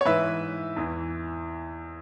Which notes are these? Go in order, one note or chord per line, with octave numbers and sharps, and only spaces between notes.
C#5
G#2 E3 B4 E5
E2 E3